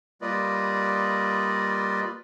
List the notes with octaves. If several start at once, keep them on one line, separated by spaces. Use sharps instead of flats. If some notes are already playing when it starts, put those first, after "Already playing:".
G3 A#3 F4 B4 D5 D#5